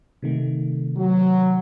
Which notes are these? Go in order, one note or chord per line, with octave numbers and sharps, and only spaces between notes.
C3 D#3 A3
F#3